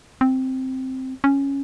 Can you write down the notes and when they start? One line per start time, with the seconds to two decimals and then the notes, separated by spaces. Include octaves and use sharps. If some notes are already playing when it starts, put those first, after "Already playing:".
0.21 C4
1.24 C#4